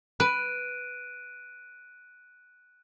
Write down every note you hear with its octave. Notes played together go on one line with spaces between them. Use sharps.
B4 F#6 D7 D#7